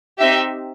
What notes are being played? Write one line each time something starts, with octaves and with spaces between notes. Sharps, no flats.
C4 D#4 G4 E5